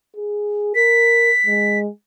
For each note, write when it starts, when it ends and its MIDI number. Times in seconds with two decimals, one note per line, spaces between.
0.16 0.74 68
0.75 1.31 70
0.75 1.79 95
1.47 1.88 56